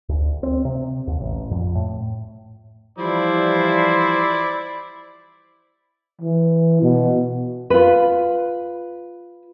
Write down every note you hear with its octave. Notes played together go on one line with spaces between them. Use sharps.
D2
C4
C3
D#2
A1
F2
A2
E3 F3 G3 E4 C5 D5
E3
B2
F4 B4